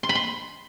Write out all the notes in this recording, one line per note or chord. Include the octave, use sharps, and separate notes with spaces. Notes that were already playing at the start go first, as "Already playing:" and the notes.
C6
B5
C6